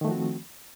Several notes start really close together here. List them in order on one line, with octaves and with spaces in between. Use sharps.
D#3 A3 F3 F#4 C4